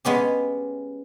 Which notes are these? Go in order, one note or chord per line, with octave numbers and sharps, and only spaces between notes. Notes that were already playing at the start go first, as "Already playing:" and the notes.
G#3 B3 C#4 G4